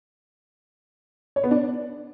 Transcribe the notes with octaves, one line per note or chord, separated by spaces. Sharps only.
C#5
B3
D4